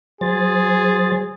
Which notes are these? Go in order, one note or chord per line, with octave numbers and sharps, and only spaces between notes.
F#3 G#4 C5 A6